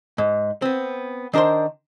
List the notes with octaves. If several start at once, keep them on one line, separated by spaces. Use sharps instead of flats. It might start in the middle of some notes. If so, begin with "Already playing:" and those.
G#2
B3 C4
D#3 D4 A#4 C5 C6